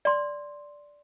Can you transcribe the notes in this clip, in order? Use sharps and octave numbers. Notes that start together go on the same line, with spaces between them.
D5 C6